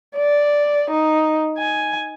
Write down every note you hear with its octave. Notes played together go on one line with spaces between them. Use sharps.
D5
D#4
G#5